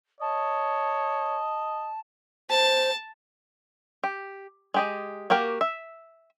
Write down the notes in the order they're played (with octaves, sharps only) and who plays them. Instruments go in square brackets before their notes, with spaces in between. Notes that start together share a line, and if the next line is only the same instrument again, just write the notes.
[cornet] C#5 [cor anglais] D#5 [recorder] A5
[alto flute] C5 [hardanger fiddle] A5
[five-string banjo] G4
G#3 G4 D#5
A#3 F#4 G4 A#4
E5